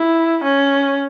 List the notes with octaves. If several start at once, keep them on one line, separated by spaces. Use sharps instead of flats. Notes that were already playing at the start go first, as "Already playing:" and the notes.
Already playing: E4
C#4